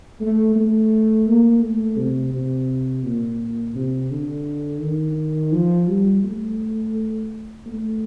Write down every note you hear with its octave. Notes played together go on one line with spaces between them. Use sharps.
A3
A3
A#3
A3
C3
C3
A#2
C3
D3
D#3
F3
G3
A3
A3